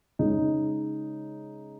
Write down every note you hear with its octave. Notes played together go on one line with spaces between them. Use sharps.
C#3 G#3 D#4